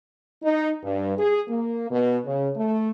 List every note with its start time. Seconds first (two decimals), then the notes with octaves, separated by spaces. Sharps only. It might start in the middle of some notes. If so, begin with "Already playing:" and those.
0.42 D#4
0.83 G2
1.18 G#4
1.49 A#3
1.90 B2
2.25 C#3
2.56 A3